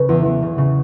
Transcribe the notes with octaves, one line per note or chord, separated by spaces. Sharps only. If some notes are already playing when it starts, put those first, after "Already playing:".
Already playing: C#3 A4 B4
E2
E2
C#3
C#3